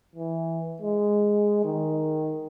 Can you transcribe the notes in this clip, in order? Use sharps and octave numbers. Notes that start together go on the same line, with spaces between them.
E3
G#3
D#3